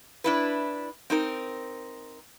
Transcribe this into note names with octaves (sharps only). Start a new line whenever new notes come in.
D4 E4 B4
C4 D#4 A#4